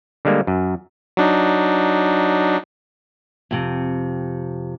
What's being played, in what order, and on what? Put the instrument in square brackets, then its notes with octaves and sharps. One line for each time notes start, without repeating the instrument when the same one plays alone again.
[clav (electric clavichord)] D3 G3 G#3 A#3
F#2
[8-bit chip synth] F#3 D4 D#4
[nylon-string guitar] F2 C3